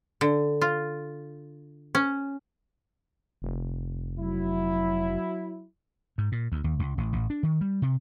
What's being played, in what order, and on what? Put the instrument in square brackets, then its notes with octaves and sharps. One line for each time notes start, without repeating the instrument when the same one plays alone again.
[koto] D3
F4
C#4
[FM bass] F1
[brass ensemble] F#3 E4
[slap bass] G#2
A#2
D2
D#2
C#2
A1
A1
D4
D#3
G3
C3